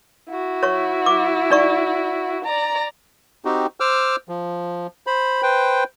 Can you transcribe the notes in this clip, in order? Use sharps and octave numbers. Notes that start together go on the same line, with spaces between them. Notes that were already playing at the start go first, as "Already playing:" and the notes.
E4 F#4
C#5 C#6
D6
D#4 D5 C#6
D5 A#5
C4 D#4 F#4 G4
C5 D6 E6 F6
F3
C5 B5
B4 C5 G5